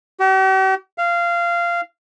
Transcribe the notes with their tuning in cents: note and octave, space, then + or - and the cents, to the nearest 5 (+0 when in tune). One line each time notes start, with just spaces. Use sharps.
G4 -45
F5 -15